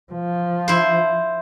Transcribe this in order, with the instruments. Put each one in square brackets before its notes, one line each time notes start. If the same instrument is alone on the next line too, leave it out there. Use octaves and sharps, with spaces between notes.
[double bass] F3
[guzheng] E4 C5